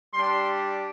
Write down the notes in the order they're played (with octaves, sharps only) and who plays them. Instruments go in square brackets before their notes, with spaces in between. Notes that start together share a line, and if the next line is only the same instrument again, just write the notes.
[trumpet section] G3 D4 G4 C6